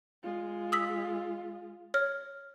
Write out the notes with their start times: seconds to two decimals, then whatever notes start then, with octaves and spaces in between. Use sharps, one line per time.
0.23 G#3 F4
0.72 D#6 E6 B6
1.94 C#5 F6